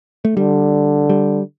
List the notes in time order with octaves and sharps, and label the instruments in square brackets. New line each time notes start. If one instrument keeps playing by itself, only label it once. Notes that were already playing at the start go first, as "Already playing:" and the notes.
[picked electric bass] A3
[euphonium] D3 [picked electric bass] G3
[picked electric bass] G3